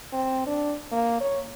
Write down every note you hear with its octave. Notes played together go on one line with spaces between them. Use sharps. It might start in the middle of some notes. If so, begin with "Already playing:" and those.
C4
D4
A#3
C#5